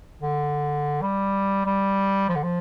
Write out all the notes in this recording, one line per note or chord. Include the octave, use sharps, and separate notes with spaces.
D3
G3
G3
F3
D3
F3